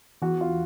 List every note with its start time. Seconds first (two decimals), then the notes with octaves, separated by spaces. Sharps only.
0.22 E2 F#4
0.41 F4